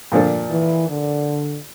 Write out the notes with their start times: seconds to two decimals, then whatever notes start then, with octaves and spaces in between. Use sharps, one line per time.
0.12 A#2 F3 A#3 D4 A4
0.50 E3
0.89 D3